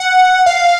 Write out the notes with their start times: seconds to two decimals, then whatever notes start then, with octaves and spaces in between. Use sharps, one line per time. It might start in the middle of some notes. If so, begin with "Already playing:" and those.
Already playing: F#5
0.46 F5